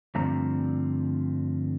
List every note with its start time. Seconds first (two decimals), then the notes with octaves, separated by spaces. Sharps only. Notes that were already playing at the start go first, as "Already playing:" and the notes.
0.15 G2 D3 F3 A3 C4 A#5